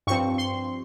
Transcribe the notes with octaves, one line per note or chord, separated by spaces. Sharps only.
G2 F3 C4 C#6
C6